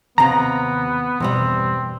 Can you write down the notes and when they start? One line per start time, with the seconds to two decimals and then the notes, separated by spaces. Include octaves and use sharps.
0.18 D#2 C3 B3 F5 A#5
1.20 E2 G2 B2 G3 C4